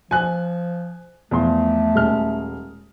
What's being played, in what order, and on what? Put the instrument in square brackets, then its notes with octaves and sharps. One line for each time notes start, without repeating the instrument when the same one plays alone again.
[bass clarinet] F3 [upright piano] G#5 F#6
[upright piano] E2 F3 C6 [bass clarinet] A3
[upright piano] D#1 G#3 F6